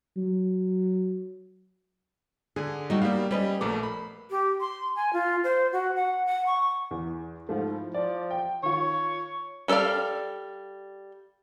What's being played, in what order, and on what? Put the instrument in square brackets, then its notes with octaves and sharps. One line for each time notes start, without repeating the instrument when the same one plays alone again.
[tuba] F#3
[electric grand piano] D3 G#4 [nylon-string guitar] G#5
[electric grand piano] F#3 [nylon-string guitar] G3 D#4 F#4
[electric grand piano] G3 A#3 F5 [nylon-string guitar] B3
[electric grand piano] G3 [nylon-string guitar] C#4 B4 D#5
[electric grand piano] A#1 A3 D6 [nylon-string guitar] A#4
[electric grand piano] B5
[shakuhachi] G4
C6
G#5
F4
C5
F#4
F#5
F#5
C#6
[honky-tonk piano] E2
[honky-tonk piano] G#2 A3 [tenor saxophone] F3
[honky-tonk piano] E4
[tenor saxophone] F3 [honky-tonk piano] D5
[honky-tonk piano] G5
[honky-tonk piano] D#3 F4 [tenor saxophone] C#5
[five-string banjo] G3 A4 C#5 D5 F5